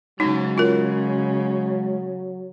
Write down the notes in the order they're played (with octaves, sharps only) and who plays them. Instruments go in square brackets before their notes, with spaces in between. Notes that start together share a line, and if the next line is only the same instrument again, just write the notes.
[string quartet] C#3 [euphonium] F#3 [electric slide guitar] G#3 A#5 [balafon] D#4
[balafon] F4 A#4